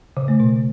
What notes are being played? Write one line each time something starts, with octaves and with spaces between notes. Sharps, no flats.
C#3
A3
B2